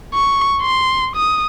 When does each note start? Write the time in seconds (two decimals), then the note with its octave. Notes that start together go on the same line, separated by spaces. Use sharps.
0.14 C#6
0.62 C6
1.16 D#6